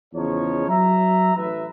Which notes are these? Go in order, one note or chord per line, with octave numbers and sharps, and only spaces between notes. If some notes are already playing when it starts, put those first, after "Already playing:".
E2 C#3 F3 D#4 C#5
F#3 E5 A#5
A1 B4 E5